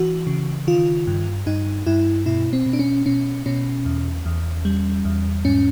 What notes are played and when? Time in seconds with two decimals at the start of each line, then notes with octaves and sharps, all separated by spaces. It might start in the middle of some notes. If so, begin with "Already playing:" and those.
Already playing: E3 F#4
0.27 C#3
0.67 D#3 F4
1.07 G2
1.46 G2 D#4
1.86 G2 E4
2.26 B2 E4
2.53 C4
2.66 B2
2.73 D4
2.79 C#4
3.06 B2 C#4
3.46 B2 C#4
3.85 E2
4.26 E2
4.65 G3
5.05 E2
5.45 G#2 C#4